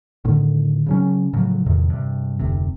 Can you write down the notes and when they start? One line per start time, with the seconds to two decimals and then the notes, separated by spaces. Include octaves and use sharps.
0.25 A2 D3 D#3
0.86 C#3 F#3 C#4
1.33 A2 C#3 F3 F#3
1.66 E2 A2 C3 D#3
1.90 G2 C3
2.39 F1 D2 C3